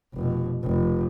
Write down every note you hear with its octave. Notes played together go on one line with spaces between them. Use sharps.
F1 B2
F1